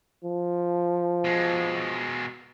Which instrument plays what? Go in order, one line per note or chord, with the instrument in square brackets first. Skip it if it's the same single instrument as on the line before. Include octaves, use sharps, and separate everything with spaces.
[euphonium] F3
[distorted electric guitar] B2 G#3